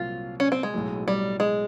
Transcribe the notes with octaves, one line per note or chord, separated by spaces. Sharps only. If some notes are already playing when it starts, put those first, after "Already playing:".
Already playing: C2 A#2 F#3 F4
C#4
C4
G#3
B1 A2 F#3
G3
G#3